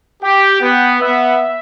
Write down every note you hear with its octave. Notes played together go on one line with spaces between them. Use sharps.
G4 G5
B3
B3 E5